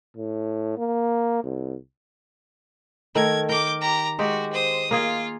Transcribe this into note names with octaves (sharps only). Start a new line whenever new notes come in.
A2
A#3
C2
D#3 A3 A#4 G#6
A#4 D6 G6
G4 A#5
G#3 F#4 G4
C5 D#6
A#3 F4 G#4